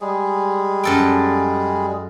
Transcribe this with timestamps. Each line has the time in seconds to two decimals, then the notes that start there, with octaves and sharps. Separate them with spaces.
0.01 G3 G#3 G#4
0.83 F#2 A4 G5